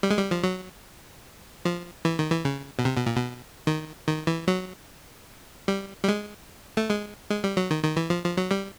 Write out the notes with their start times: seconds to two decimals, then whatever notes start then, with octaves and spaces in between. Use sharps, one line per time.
0.03 G3
0.10 G#3
0.18 G3
0.31 F3
0.44 F#3
1.65 F3
2.05 E3
2.19 D#3
2.32 E3
2.45 C#3
2.79 B2
2.85 C3
2.96 B2
3.06 A#2
3.16 B2
3.67 D#3
4.07 D#3
4.27 E3
4.48 F#3
5.68 G3
6.04 G3
6.08 G#3
6.77 A3
6.89 G#3
7.30 G#3
7.44 G3
7.57 F#3
7.71 D#3
7.84 D#3
7.96 E3
8.10 F3
8.24 F3
8.37 F#3
8.51 G3